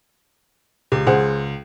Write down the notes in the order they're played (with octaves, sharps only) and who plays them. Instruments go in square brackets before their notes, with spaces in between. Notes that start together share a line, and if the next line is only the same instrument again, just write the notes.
[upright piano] C#2 [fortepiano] G4
[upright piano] C#2 [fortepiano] G#4 C5 F#5